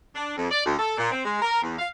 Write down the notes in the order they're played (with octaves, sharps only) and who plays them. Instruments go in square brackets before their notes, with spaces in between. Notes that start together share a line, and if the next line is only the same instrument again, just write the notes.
[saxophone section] D4
F2
D5
D2
A4
A#2
C4
G#3
A#4
E2
F5